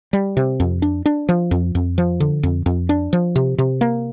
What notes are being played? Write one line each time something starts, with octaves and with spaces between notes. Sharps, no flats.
G3
C3
F2
D4
D4
F3
F2
F2
F3
D3
F2
F2
D4
F3
C3
C3
A#3